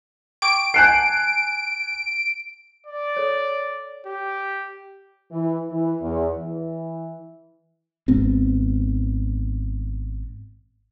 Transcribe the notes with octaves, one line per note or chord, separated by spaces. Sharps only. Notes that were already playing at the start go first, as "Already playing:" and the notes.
G5 C#6 D6 D7
F#5 G#5 A5 F#6 G6 C7
D5
A4 C#5
G4
E3
E3
E2
E3
G#1 G#2 B3 C4